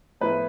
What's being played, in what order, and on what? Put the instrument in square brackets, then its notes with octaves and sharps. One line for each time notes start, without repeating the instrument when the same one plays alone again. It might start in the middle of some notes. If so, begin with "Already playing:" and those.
[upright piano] A2 F3 B3 E4 B4